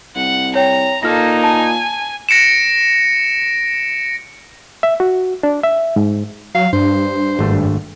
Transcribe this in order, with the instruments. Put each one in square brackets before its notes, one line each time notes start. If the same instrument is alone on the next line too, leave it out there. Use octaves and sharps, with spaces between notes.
[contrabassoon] C2 [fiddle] F#5
[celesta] C#5 G5 [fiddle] A#5
[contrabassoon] A#2 [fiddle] A#3 A4 [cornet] D#4 [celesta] F6 A#6
[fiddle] G#5 [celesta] A5
[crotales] A#6 C#7 D7 E7
[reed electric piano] E5
F#4
D4
E5
G#2
[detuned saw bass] F#3 [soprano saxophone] F5
[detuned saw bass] G2 [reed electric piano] D4 [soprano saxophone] C5
[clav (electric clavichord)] G#1 A3